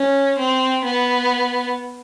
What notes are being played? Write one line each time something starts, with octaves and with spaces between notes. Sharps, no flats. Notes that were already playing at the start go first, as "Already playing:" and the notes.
Already playing: C#4
C4
B3